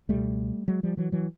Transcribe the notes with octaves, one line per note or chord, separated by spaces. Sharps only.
C#2 B2 G3 A3
F#3 G#3
F3 G3
E3 F#3
E3 F#3